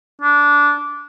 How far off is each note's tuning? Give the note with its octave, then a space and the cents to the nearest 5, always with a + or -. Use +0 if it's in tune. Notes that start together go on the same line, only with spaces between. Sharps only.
D4 -15